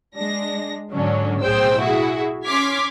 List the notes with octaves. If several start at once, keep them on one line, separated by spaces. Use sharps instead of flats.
G#3 D4 A#6
G#2 D3 F#3 C#4 D4
B1 A2 G#4 C5 G5 E6
E4 F#4 G#4 E5
C#4 C6 D6 F6 G#6 B6